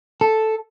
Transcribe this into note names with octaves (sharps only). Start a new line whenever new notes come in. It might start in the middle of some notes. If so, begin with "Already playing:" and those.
A4